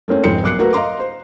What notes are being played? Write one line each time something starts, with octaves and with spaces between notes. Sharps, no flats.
A3 A#3 C4 C#4
F1 G#2 C4 C6 C#7
B1 A#3 D6 F#6 C7 C#7
A3 A#3 F#4 A#4 B4
D#5 F5 A#5 C6 D6
C5